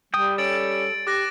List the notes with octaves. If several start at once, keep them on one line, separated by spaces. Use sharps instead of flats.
G3 G5 D#6
C#4 A4 A6 D7 F#7
G4 D6 F#6 A#6